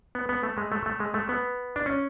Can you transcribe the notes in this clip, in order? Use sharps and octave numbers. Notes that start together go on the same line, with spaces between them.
B3
B3
A3
G#3
A3
A3
G#3
A3
B3
D4
C#4